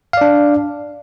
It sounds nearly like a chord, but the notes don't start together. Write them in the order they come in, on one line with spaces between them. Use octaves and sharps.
F5 D5 D4